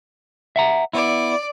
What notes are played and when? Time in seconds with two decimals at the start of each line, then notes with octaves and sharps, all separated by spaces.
0.56 E5 F#5 A#5
0.93 B3 E4 D5